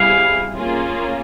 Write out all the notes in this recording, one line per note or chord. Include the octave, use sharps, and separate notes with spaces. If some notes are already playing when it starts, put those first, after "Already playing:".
Already playing: B2 G3 C4 E4 G#4 F5
A#3 C#4 F4 G#4